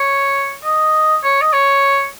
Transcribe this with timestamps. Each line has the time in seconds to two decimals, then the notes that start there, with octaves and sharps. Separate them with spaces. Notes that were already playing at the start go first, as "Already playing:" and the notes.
Already playing: C#5
0.64 D#5
1.24 C#5
1.42 D#5
1.53 C#5